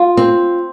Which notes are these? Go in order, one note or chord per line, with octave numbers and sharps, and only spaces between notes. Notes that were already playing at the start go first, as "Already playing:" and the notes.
Already playing: F4
C4